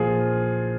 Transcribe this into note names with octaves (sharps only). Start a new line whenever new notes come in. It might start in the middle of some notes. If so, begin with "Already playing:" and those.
Already playing: A#2 F3 F4 G#4